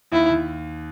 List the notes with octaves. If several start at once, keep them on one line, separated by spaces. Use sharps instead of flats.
D#2 E4
D#2